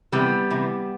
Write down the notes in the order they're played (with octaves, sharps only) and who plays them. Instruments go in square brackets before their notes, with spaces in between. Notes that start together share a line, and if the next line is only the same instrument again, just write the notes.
[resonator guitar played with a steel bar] C3 E3 G3 B3
C3 E3